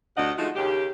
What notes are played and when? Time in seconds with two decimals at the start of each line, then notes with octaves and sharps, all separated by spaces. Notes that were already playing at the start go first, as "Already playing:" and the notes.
0.16 D2 C3 D4 D#5 F#5
0.37 F3 G#3 A3 D#4 F#4
0.55 D#2 C#3 G4